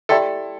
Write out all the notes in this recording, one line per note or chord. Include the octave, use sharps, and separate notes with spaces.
E4 G4 A4 D5 G5 C6